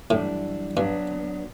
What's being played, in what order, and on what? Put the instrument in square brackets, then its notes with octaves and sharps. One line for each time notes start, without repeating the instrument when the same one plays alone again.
[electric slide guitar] F#2 E3 G3 D4 [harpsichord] A2
[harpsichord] G2 [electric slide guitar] F#3 B3 D4